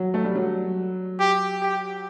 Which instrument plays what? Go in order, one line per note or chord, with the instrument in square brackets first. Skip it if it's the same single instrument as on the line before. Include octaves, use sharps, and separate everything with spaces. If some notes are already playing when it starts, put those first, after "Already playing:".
Already playing: [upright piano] F#3
A3
G3
F#3
[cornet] G4
G4